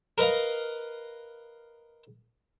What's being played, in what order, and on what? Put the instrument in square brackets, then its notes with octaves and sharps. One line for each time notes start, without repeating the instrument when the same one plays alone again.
[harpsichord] A#4 B4 D#5 F5 A#5